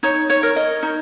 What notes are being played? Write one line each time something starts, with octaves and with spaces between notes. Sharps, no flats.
D#4 C#5
C#5
A#4
D#5
D#4